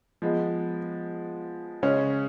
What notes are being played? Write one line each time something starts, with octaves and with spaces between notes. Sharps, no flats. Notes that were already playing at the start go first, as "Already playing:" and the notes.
F3 G#3 B3
C#3 G#3 C#4